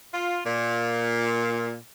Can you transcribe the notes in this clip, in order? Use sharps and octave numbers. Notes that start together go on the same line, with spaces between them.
F4
A#2